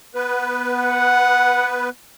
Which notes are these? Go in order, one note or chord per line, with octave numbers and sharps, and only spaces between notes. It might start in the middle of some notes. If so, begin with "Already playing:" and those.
B3 B4
F#5